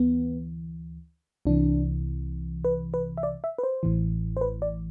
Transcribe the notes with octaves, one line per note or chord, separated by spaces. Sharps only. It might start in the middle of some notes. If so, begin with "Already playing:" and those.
Already playing: D2 E3 B3
C2 C3 E3 D4
B4
B4
E5
D5
E5
B4
C5
A1 A2 E3
C5
B4
D5